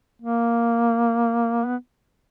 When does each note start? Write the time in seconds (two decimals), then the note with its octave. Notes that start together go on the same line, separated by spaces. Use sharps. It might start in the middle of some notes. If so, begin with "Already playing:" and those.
0.22 A#3
1.66 B3